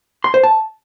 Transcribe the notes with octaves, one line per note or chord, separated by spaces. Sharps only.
C6
C5
A5